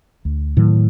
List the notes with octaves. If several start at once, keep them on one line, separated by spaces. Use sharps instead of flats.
D2
A2 D#3 F#3